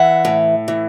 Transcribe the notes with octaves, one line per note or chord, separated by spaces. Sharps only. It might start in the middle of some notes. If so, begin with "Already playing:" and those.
Already playing: E3 E5 F#5
A2
E3